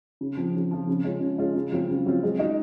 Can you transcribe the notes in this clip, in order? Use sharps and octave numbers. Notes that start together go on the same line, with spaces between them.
C#3
F3 C4 F4
C#3
F3 C4 F4
C#3
G#3 C#4 F4
C#3
G#3 C#4 F4
C#3
F#3 C4 F4
C#3
F#3 C4 F4
G#3
D#4 F#4